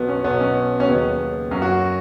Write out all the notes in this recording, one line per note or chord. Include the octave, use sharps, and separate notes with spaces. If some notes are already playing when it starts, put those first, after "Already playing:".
Already playing: B1 B2 F#3 B3
C#4
B1 B2 F#3 B3
C#4
C#4
D#2 C#3 F#3 B3
F#2 F#3 C#4
F#4